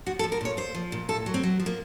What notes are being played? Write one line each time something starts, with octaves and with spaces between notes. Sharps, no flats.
F3 F#4
A4
F3
A#4
A#2 C#5
A#2 C5
F3
A#2
A2 A4
F#3
C4
F#3
F3
A#3